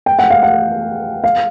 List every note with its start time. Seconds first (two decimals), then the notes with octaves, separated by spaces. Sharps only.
0.06 G5
0.19 F#5
0.30 F5
0.43 F#5
1.24 F5